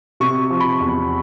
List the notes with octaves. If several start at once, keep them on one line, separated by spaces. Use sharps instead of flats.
C3 C#6
F3
B5
E2